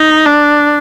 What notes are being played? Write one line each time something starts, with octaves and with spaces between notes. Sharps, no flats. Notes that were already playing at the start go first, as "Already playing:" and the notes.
Already playing: D#4
D4